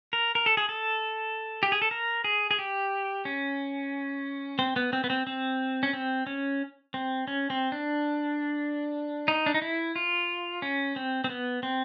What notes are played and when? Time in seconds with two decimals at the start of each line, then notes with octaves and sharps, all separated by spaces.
0.13 A#4
0.35 A#4
0.46 A4
0.57 G#4
0.69 A4
1.63 G4
1.72 G#4
1.82 A4
1.91 A#4
2.24 G#4
2.51 G#4
2.59 G4
3.25 C#4
4.59 C4
4.76 B3
4.93 C4
5.04 B3
5.10 C4
5.27 C4
5.83 C#4
5.93 C4
6.27 C#4
6.94 C4
7.28 C#4
7.50 C4
7.72 D4
9.28 D#4
9.46 D4
9.54 D#4
9.62 E4
9.96 F4
10.62 C#4
10.96 C4
11.24 C4
11.29 B3
11.63 C4